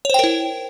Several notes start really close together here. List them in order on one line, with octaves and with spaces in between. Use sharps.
C#5 C5 G5 A#4 E4